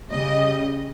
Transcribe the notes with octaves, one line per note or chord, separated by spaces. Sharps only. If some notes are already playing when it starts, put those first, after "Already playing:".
C#3 G3 D#5